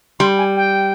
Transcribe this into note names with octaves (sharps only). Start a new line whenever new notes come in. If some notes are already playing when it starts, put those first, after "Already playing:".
G3 C6
G#5
G5